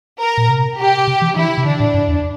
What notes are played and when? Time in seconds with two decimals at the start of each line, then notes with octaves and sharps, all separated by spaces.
0.20 A#4
0.38 A#2
0.49 C3
0.78 G4
1.07 C3
1.22 E3
1.36 E3 E4
1.58 C3
1.65 D3 D4
1.80 A2
1.94 G2
2.08 E2